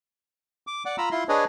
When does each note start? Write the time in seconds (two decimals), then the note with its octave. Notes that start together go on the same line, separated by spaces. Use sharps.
0.67 D6
0.85 D5 F#5 D6
0.98 F4 A#5 B5 E6
1.11 E4 F4 C6
1.29 D4 G#4 B4 C#5 D#5